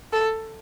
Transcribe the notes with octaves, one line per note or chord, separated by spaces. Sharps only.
A4